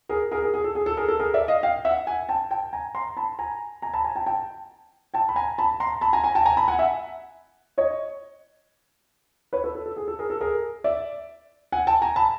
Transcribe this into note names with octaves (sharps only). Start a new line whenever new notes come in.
G#4 A#4
G#4 A#4
G#4
G#4
A4
G#4
A4
G#4 A#4
A4
G#4 A#4
D5 E5
D#5 F5
F5 G5
E5 F#5
F#5 G#5
G5 A5
G5 A5
G#5 A#5
A#5 C6
A5 B5
G#5 A#5
G#5 A#5
A5 B5
G#5 A#5
G5 A5
G5 A5
G5 A5
B5
G#5 A#5
A5 B5
A#5 C6
A5 B5
G#5 A#5
G#5 A#5
G5 A5
G#5 A#5
A5 B5
F#5 G#5
E5 F#5
C#5 D#5
B4 C#5
A4 B4
A4
A4
G#4
A4
G#4 A#4
A4
G#4 A#4
D5 E5
F#5 G#5
G5 A5
G#5 A#5
A5 B5